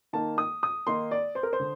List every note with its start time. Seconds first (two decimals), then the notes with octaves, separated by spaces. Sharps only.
0.13 D#3 A#3 D#4 A5
0.38 D#6
0.63 D#6
0.87 D#3 A#3 D#4 C6
1.11 D5
1.35 C5
1.43 A#4
1.53 C5
1.60 D3